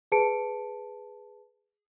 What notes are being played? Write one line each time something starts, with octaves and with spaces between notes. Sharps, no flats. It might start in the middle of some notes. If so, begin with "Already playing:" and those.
G#4 B4 A5 C#7 D7